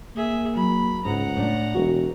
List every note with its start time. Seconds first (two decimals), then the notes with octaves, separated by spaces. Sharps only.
0.16 A#3 G#4 E5
0.55 F#3 B5
1.05 C#2 G#2 F#5 A#5
1.37 A2 D4
1.75 E1 F#4